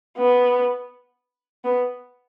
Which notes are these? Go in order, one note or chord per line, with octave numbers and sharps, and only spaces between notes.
B3
B3